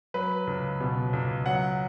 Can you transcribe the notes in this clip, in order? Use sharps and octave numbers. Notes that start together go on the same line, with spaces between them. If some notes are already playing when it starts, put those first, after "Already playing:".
F#3 B4
C#2
B2
C#2
F#3 F#5